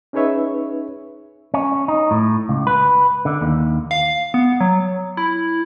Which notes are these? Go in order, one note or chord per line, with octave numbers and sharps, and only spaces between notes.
C#4 D#4 G#4 B4 C#5 E5
C#4
D#4
A2
C#2
B4
D3
D#2
F5
B3
F#3
E4